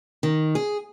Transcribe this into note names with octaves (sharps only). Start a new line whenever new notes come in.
D#3
G#4